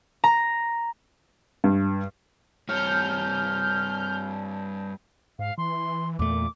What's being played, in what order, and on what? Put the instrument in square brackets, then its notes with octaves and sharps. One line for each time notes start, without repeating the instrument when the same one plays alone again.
[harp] A#5
[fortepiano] G2
[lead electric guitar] G2 C#5 [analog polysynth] F6 G6
[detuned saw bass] G#2 [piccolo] F5
[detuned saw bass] E3 [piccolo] C6
[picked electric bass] E2 A3 [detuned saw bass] A#2 [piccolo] D6